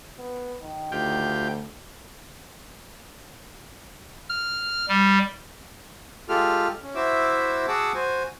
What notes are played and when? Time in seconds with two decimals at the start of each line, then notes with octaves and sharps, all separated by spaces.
0.19 B3
0.61 D#3
0.92 D2 F4 G4 G5
4.30 F6
4.88 G3
6.29 G#3 F4 G4 A4 F6
6.83 C#4
6.95 E4 F#4 C5 E5 D6 E6
7.68 F#4 G#4 F#5 A5 D6 E6
7.95 F#4 C5 G#5